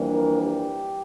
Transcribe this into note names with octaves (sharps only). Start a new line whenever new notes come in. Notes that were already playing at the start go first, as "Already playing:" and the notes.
Already playing: F2 E3 G3 A#3 D4
A#4
G4